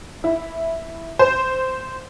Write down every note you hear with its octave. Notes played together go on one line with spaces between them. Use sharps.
E4
C5